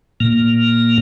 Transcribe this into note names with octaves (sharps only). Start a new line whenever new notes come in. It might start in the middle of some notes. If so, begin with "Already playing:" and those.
A#2 A#3